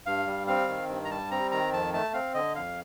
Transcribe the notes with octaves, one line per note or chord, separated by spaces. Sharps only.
G2 F5
G3
C4 F5
D#3
G2
A#5
G3 A5
C4 A#5
D#3 A#5
F2 A5
A3 A5
C4 F5
D3 D#5
F2 F5